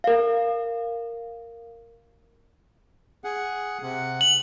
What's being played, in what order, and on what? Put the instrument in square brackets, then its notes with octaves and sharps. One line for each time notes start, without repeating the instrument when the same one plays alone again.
[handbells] A#4 F5
[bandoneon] G#4 F#5
C3 F#5
[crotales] F#7